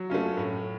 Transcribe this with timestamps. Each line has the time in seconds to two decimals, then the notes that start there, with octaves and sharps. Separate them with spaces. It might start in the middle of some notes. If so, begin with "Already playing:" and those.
Already playing: F#3
0.10 A3 C#4 F4
0.37 A2